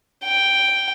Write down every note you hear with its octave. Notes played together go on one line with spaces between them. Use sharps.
G5